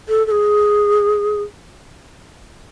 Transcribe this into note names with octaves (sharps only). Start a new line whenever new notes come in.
A4
A4
G#4